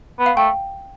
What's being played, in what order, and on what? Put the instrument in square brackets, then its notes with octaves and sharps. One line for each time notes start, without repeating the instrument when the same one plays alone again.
[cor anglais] B3
[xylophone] F5
[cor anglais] A3 [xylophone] G5